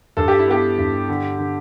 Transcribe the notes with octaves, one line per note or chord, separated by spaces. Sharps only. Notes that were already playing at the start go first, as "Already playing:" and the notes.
G2 A4
G4
E4
B3 G4
G2
D3
D3